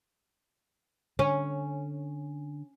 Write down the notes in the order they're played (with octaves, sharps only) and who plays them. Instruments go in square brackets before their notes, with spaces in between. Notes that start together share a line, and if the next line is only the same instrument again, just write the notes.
[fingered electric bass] D3 [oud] C#4